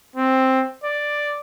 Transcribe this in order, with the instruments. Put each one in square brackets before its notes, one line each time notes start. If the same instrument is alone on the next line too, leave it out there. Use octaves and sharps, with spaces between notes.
[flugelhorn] C4
D5